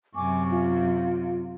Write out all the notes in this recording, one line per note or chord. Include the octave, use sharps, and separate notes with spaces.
F#2 C3 G#5 C#6 D6
F4